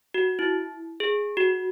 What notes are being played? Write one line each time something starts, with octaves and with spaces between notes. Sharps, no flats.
F#4
E4
G#4
F#4